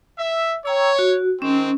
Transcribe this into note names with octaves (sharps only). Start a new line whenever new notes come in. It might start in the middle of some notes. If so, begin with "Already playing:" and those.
E5
C#5 G5 A#5 E6
F#4
D#3 G#3 C4 C#4